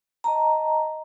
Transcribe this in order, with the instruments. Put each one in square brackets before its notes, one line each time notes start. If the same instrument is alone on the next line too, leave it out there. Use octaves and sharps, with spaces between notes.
[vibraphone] D#5 A5 A#5